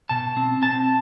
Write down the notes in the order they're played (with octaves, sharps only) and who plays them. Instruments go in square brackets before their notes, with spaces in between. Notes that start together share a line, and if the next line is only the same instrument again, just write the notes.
[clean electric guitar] B2 A5
C4
C4 A5